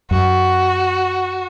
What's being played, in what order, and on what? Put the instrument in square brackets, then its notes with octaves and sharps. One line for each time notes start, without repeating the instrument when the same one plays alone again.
[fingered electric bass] F#2 [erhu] F#4